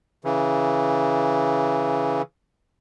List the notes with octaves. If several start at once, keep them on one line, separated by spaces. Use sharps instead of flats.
C#3 E3